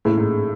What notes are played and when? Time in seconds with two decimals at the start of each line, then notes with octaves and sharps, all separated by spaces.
0.05 A2
0.18 G#2